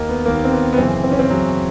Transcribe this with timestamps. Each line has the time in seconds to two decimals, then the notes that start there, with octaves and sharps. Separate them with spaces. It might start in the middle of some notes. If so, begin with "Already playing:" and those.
Already playing: D#2 D#3 A#3
0.09 B3
0.25 D#2 D#3 A#3
0.45 C4
0.52 B3
0.73 B3
0.78 F#2 C#3 E3 C4
1.03 C4
1.11 C#4
1.19 C4
1.30 F#2 C#3 E3 F#3